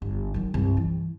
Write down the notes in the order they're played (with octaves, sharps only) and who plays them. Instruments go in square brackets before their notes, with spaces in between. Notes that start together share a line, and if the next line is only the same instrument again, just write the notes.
[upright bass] G1
D#3 F#3
C2 G2
E3